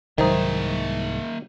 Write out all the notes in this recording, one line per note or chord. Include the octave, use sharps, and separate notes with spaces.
C2 G#2 D#3 F#3 A#3 D#4 C5 E5